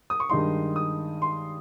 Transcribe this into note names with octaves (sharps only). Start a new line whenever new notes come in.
D#6
C#6
G2 D#3 G#3 D#4 C6
D#6
C6